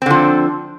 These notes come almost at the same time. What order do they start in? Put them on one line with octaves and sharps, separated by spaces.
C4 D3 F3